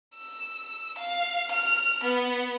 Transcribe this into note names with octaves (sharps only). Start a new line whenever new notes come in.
E6
F5
F6
B3